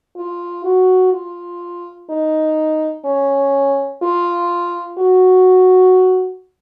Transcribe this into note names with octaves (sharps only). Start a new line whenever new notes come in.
F4
F#4
F4
D#4
C#4
F4
F#4